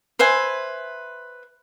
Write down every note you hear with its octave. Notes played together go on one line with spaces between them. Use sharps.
B4 C5 E5 G#5